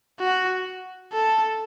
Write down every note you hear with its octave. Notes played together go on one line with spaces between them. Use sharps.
F#4
A4